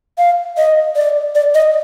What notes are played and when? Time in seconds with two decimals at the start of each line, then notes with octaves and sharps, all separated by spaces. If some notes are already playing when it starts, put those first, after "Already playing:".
0.18 F5
0.57 D#5
0.96 D5
1.35 D5
1.55 D#5